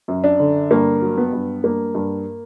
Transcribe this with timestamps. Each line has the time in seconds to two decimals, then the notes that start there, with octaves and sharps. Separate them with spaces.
0.08 F#2
0.24 D4
0.39 D3
0.71 G2 A#3
1.02 F#3
1.17 B3
1.33 G2
1.64 G2 A#3
1.95 G2